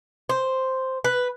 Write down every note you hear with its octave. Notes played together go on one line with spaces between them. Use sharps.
C5
B4